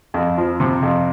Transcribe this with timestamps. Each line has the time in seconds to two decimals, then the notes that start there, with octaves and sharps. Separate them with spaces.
0.14 F2
0.38 F3
0.60 C3
0.82 F2